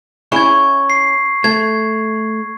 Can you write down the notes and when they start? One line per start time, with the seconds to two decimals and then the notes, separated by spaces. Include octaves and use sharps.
0.32 C#4 E4 G#4 C#6 G#6
0.90 C7
1.44 A3 G#6